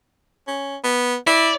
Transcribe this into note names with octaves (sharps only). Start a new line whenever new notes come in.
C#4
B3
E4 D5